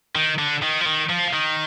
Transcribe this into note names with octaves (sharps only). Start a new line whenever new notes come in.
D#3
D3
D#3
F3
D#3
F3
D#3